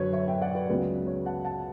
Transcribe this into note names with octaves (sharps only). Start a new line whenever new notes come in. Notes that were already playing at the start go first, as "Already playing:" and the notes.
Already playing: F#2 D3 F#3 B4 C#5
C#5 E5
E5 G5
D5 F#5
B4 D5
C#2 C#3 F#3 B3 B4
C#5
F#5 A5
F#5 A5